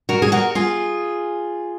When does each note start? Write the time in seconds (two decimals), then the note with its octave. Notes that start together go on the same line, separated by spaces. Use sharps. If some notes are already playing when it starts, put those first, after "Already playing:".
0.09 F#4 A#4
0.22 G#4
0.32 F#4 A#4
0.55 F4 G#4